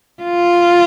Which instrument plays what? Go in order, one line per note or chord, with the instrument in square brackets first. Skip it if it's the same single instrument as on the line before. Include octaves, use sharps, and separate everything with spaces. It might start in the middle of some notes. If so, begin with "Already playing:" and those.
[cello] F4